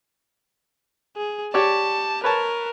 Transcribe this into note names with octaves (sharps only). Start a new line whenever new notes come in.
G#4
G4 C#5 D5 A5
A#4 B4 C#5 A5